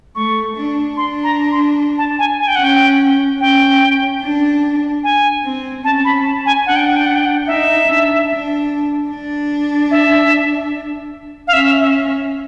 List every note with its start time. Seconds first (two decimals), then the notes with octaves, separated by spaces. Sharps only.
0.15 A3 C#6
0.57 D4
0.97 D4 C6
1.24 A#5
1.52 C6
1.98 A5
2.19 G#5
2.39 G#5
2.48 G5
2.56 C#4 F#5
2.64 G5
3.41 C#4 G5
4.22 D4
5.04 G#5
5.44 C4
5.84 C#4 A5
6.05 B5
6.25 A5
6.46 G#5
6.66 D4 F#5
6.76 G5
6.86 F#5
6.96 G5
7.06 F#5
7.15 G5
7.25 F#5
7.47 D#4 E5
7.88 D4
8.29 D4
9.10 D4
9.91 E5
11.48 F5
11.53 C#4 E5
11.80 E5